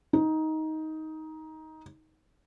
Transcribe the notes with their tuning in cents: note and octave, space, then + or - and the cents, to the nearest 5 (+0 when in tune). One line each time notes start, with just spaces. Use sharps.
D#4 +15